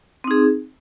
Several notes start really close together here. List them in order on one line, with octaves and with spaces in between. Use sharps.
C4 D#4 G#4